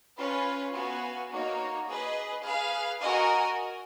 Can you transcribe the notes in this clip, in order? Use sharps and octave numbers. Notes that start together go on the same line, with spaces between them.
C#4 F4 B4
B3 F#4 B4 F5 G#5
A#3 D#4 F#4 C#5
G#4 B4 D#5
G#4 B4 F5
F#4 A#4 D#5 G#5